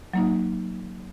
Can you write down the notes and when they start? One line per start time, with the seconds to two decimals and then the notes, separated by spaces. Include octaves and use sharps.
0.14 F#3 A#3 D#4